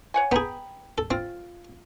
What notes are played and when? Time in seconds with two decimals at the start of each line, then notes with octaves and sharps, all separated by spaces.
0.14 C#5 F#5 G#5
0.32 B3 G#4 G5 A#5 B5
0.98 A4
1.11 C4 F4